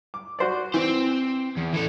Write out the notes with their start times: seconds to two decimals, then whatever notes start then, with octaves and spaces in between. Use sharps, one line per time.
0.14 D6
0.39 F#4 C5 D5
0.74 E3 C4 C5
1.57 E2
1.73 E3 A4